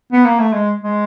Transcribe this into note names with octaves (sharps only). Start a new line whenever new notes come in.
B3
A#3
A3
G#3
G#3